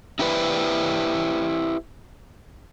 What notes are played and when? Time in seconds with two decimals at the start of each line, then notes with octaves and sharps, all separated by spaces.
0.19 D#4 E4 G4 B4 C5 D5